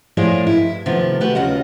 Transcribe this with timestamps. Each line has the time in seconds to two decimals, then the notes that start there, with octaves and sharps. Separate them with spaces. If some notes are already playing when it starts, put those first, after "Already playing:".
0.17 A2 F3 G#3 G#4 C#5 D5
0.47 G2 E4
0.86 C3 D#3 F3 A3 B3
1.21 A3 F#4 G4 B4
1.35 D#2 C#3 F4 D#5 F#5